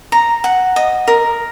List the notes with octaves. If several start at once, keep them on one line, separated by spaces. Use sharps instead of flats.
A#5
F#5
D#5
A#4